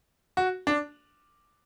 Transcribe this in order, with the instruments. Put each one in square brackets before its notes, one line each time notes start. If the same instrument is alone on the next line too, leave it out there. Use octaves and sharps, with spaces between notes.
[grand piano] F#4
D4